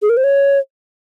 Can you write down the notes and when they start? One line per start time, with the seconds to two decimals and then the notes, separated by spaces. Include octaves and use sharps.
0.02 G#4
0.09 A#4
0.17 C5
0.24 C#5